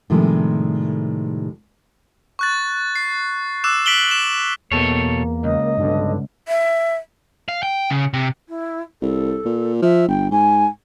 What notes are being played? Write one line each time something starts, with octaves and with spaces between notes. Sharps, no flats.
A2 C3 D#3 F3 G3 G#3
C#6 F#6 A6
C7
D6 E6 F#6 E7
B6 D7 F#7 G7
E7
E2 B2 A#3 A4 C#5
C#2 D#5
B1 G2 D3
E5
F5
G5
C#3
C3
E4
C2 A4
A#2
F3 E5
G1 G5
G#2 G#5